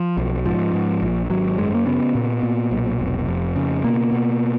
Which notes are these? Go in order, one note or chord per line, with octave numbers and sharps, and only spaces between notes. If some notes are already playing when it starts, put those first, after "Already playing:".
Already playing: F3
B1
G#2 F3
G#2
A#1
G#1 F#3
F#2 G#3
A#3
C#3 B3
A#2
A#2
B1
F1
F2
C#3
B2 A#3
B2